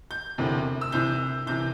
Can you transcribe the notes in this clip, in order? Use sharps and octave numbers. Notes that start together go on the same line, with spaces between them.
G6
E1 D2 C3 E3
E6
C2 C3 E3 G6
C2 C3 E3 G6